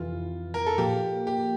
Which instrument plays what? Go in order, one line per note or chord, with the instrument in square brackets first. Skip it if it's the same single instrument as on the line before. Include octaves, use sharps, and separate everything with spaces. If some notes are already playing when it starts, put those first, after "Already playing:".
Already playing: [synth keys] F2 C3 E3 [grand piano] F4
[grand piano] A#4
A4
[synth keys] A#2 F3 A#3 [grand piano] G4
[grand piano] G4